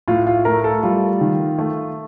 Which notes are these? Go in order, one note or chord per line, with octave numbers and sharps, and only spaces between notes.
A2 F4
F4
A3 A#4
A4
G3 F4
D#3
A3